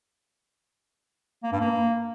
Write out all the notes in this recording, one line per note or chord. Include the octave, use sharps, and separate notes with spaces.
A#3
G2
A#3